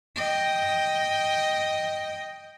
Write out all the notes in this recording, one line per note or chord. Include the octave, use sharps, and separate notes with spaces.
D#5 G5